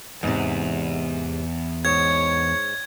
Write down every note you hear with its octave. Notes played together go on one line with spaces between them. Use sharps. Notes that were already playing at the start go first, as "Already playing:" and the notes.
E2 G#2 C3
G#2 C#5 G#6